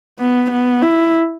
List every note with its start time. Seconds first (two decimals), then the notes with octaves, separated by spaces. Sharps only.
0.19 B3
0.50 B3
0.82 E4